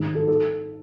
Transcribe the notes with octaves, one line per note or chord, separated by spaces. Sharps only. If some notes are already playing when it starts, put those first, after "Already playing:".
Already playing: G#2 D#3
A4
A4